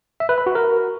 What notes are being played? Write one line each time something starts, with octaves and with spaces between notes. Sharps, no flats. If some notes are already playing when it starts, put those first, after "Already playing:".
E5
B4
B5
F#4
A#4